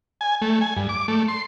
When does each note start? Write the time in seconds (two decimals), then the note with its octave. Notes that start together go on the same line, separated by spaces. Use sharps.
0.21 G#5
0.42 A3
0.61 G#5
0.77 G2
0.89 D6
1.08 A3
1.28 C6